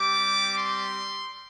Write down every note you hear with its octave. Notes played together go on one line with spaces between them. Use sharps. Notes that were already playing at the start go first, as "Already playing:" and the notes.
Already playing: G3 C4 G4 D6
C6